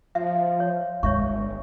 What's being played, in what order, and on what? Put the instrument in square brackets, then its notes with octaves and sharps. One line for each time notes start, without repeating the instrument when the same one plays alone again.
[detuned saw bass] F3 [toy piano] E5 [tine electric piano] F5
[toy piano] C#5
[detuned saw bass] G1 [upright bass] G#3 [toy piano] C#5 E5 C#6